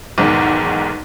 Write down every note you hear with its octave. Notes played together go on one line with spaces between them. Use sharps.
B1 E2 G#2 D#3